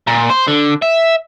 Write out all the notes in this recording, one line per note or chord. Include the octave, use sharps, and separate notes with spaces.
A#2
C5
D3
E5